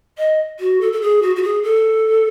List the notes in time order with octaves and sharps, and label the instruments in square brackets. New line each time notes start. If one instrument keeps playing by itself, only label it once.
[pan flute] D#5
F#4
A4
A4
G#4
F#4
F#4
G#4
A4